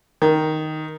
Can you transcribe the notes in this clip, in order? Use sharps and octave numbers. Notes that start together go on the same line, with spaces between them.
D#3